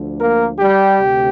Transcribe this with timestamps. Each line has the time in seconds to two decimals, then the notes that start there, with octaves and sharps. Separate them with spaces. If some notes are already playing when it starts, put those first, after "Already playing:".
Already playing: D2 D3 F3
0.21 A#3 A#4
0.59 G3 G4
0.98 D2 C3